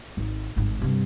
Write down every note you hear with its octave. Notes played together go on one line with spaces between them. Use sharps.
G#1
G#1 G#2
G2 C3